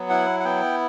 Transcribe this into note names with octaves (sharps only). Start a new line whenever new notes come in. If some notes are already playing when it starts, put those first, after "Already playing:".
Already playing: F#3 B3
E4 F#5
F#5
B3 G5